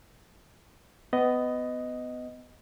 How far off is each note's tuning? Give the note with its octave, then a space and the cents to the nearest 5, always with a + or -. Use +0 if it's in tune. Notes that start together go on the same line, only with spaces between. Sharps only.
B3 +25 D#5 +0